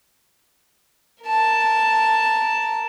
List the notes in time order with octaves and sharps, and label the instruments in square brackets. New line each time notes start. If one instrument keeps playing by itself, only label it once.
[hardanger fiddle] A#4 A5